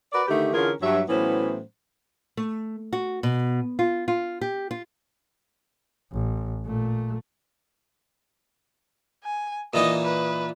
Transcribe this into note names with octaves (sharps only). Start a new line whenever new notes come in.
F#4 A#4 B4 D5
D3 D#3 A3 D#4 G4
D3 E3 C#4 F4 G#4 A#4
G2 F#3 E5
A2 E3 F#3 B3 C#4 C5
A3
F#4
B2
F4
F4
G4
F4
A1
A#2 A3
G#5
A#2 E3 D#4 D#5
B4